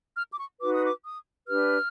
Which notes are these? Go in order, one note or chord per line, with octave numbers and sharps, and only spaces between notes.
F6
D6
C#6
D#4 F#4 B4 D6
D#6
D6
D#6
D4 G4 B4 F6